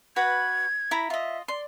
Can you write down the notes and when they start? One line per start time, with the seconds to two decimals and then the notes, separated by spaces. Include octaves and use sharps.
0.16 F#4 B4 B5 G#6
0.91 E4 A#5 B5
1.10 F4 D#5 E5
1.48 D5 C6